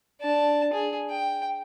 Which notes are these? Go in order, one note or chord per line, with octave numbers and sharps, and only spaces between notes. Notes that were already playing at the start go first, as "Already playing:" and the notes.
D4 A5
G#4
G5